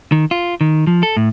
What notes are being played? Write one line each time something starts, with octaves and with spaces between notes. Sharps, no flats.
D#3
F4
D#3
F3
A4
A2